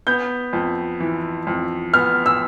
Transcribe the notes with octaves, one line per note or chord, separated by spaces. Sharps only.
B3 G6
F2
E3
F2
B3 F6
E6